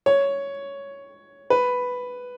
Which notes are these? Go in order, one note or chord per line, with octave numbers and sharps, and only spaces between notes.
C#5
B4